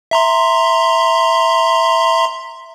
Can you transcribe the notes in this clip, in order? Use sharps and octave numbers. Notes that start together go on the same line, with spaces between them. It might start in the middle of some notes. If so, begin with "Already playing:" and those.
E5 A#5 C6